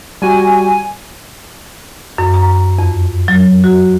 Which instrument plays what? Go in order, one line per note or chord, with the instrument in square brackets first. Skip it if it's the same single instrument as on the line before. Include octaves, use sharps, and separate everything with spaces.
[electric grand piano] G3 F#4 [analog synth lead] G#5
[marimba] F#2
A#5
F2
F#3
F#4